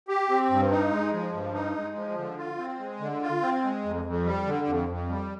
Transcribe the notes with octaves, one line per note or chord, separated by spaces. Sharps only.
G4
C4
G2
D#4
G#3
F3
G2
D#4
G#3
F3
D3
F4
C4
G#3
D3
F4
C4
G#3
F2
F2
G3
D3
F2
F2
G3